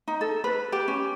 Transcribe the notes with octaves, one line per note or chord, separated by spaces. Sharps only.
D#4
A4
B4
G4
C#4